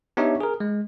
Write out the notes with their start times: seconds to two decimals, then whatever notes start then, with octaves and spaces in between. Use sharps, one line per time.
0.17 B3 D4 D#4 G4 C#5 E5
0.40 G#4 A#4
0.60 G#3